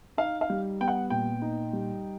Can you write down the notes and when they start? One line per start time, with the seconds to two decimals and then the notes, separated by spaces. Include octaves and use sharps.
0.18 D#4 F5
0.41 F5
0.50 G3
0.80 B3 G5
0.88 F#5
1.10 A#2 G5
1.42 D#4
1.73 G3